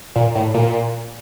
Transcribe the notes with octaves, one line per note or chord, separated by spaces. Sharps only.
A#2
A2
A#2